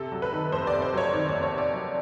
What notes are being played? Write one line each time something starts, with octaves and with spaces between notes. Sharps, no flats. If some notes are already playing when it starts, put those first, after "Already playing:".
Already playing: C3 A4
F#3
B4
D#3
F2 C5
D5
C3
C5
F#3 C#5
D#3 D5
F2 D5
C#5
C3
D5
F#3